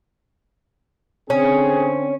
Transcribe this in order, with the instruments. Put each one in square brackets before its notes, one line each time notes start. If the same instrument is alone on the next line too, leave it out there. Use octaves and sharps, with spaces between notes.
[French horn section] D3 C4 [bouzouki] C#4 [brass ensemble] G#4